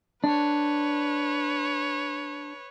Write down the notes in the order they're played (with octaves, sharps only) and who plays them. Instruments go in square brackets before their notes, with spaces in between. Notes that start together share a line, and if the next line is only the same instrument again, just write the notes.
[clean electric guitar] D4 [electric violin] B4 C#5